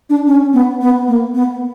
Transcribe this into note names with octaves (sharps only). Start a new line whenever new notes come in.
D4
C#4
B3
B3
A#3
B3